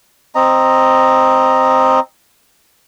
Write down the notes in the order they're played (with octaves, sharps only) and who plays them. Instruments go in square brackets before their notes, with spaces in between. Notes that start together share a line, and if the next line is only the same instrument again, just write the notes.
[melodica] C4 D#5 A#5